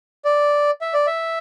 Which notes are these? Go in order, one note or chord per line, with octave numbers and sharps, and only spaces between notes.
D5
E5
D5
E5